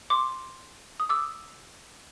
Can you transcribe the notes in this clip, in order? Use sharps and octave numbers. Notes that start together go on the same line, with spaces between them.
C6 D6
D#6
D6 E6